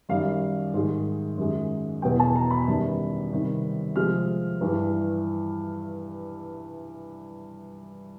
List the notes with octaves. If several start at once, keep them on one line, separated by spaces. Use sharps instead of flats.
F#2 D#3 G3 F5
G#2 D#3 G#3
F#2 D#3 G#3
E2 B2 F#3 G5
A5
A#5
B5
F#2 D#3 G3
C3 D#3 G3
C3 F3 G#3 F6
G2 E3 G3